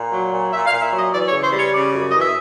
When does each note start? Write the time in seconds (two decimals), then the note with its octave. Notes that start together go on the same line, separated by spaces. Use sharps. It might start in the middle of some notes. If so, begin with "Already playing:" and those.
Already playing: A#2
0.10 F#3
0.30 A#2
0.51 A#2 E5
0.66 F5
0.71 A#2
0.82 E5
0.92 F#3 D#5
1.12 E3 D5
1.28 C#5
1.32 C#3
1.42 C5
1.52 G3 C#5
1.72 C#3 D5
1.93 F#2
2.09 E3 D#5
2.21 E5